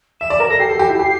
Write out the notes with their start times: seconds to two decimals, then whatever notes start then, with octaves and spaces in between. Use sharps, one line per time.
0.21 E5 E7
0.30 D5
0.40 A#4
0.49 A4 A#6
0.60 G4 C7
0.69 A4
0.79 G4
0.90 E4
0.99 G4